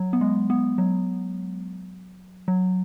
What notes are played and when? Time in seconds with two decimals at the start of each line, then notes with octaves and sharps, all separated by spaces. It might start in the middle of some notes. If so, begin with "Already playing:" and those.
Already playing: F#3
0.13 B3
0.21 G#3
0.50 B3
0.78 F#3
2.48 F#3